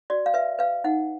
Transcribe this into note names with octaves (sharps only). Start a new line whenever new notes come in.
F#4 D5
F5
B4 E5
B4 F5
D#4 F#5